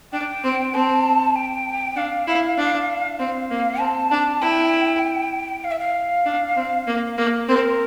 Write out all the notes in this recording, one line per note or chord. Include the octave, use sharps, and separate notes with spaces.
D4 G5
C4
C4 A5
G5
D4 F5
E4
D4
C4 F5
A#3
C4 A5
D4
E4 G5
F5
E5
F5
D4
C4
A#3
A#3
C4 A#4